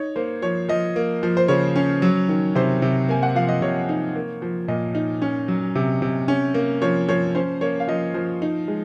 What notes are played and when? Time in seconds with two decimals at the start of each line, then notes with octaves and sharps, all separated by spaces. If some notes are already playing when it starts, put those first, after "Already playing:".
Already playing: D#4 C#5
0.16 A#3 C5
0.42 F3 C#5
0.69 F3 D#5
0.96 A#3
1.23 F3
1.37 C5
1.48 C#3 C#5
1.76 C#4
2.02 F#3
2.29 D#3
2.55 C3 C5
2.82 C3
3.09 A#3 G#5
3.23 F#5
3.35 F3 F5
3.49 D#5
3.61 C3 C#5
3.89 D#4
4.15 A#3
4.42 F3
4.68 A#2 D#5
4.95 D#4
5.22 C#4
5.48 F#3
5.75 C3
6.02 C3
6.28 C#4
6.54 A#3
6.82 F3 C#5
7.09 F3 C#5
7.35 C#4 C5
7.61 A#3 C#5
7.80 F5
7.88 F3 D#5
8.14 F3
8.42 D#4
8.68 G#3